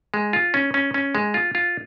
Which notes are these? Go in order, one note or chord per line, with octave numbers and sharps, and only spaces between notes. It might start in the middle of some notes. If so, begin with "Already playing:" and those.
G#3
F4
C#4
C#4
C#4
G#3
F4
F4